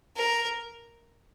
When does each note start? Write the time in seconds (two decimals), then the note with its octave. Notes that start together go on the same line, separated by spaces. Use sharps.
0.17 A#4